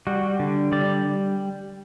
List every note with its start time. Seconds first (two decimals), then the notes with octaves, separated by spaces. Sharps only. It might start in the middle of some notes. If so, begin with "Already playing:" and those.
0.07 G3 F#4
0.39 D3
0.72 G3 D5